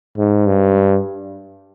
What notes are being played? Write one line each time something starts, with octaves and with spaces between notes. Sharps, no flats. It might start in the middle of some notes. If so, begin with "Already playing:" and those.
G#2
G2